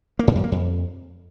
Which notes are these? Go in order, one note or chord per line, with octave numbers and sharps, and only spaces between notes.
A#3
G#2
F#2
A#3
F2